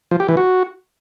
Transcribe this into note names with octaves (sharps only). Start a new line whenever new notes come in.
F3
G4
E3
F#4